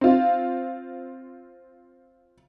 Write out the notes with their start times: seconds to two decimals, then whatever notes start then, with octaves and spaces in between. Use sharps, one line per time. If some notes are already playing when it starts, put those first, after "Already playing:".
0.01 C4 F4